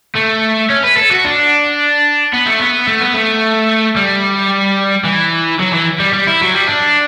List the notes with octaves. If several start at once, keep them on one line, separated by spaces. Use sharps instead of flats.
A3
C#4
B4
A4
F#4
D4
B3
A3
B3
A3
B3
A3
G3
E3
F#3
E3
G3
G3
E4
F#3
G3
D4